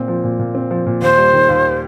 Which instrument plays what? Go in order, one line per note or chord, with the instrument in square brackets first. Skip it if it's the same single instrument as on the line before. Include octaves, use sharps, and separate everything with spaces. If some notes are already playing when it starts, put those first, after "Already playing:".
Already playing: [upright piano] A#2 C4
F3
A#2
A#2
C4
F3
A#2
[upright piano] D#2 [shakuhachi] C5
[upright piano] G3
D#3
D#2